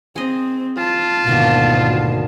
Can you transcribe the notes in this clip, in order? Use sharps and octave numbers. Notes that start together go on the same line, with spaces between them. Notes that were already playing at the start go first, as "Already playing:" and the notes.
C4 G#4 D#5
F4 A5
D2 G#2 B2 D3 D#3 A#3